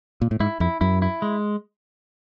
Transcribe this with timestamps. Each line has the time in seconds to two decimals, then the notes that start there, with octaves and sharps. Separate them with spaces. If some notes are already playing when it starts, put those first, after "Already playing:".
0.22 A#2
0.31 A2
0.40 G#2 E4
0.60 F2 E4
0.81 F#2 E4
1.02 E4
1.22 G#3